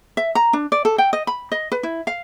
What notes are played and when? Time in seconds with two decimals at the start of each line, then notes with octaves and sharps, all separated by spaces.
0.17 E5
0.35 A#5
0.53 D4
0.72 D5
0.85 A4
0.98 G5
1.13 D#5
1.27 B5
1.52 D#5
1.72 B4
1.83 E4
2.07 F5